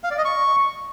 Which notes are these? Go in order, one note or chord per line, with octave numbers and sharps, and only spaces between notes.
F5
D5
D#5
C#6